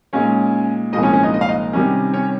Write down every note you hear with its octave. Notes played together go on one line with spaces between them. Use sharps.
A#2 G#3 C#4 D#4 C#5
C2 A#2 F3 G#3 D#4 D#5
C#4 C#5
C#4 C#5
D#4 D#5
D#5
F5
D#4 D#5
C3 D#3 G3 C#4
C#4 C#5